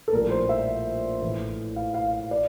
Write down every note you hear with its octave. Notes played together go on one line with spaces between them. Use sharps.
A4
A#1 A2 G3 A#4
C5
E5
A1 A2 E3
F5
F5
D5